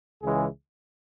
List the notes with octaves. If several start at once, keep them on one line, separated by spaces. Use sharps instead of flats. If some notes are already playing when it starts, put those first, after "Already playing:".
C#2 C#3 E3 G#3 G#4